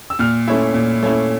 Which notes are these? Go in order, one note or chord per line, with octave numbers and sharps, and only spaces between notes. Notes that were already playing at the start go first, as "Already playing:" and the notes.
E6
A#2 F6
A3 C#4 E4
A#2
A3 C#4 E4